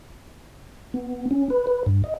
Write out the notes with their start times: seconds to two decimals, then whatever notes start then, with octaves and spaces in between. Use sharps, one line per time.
0.94 B3
1.31 C#4
1.50 B4
1.67 B4
1.86 G2
2.04 D#5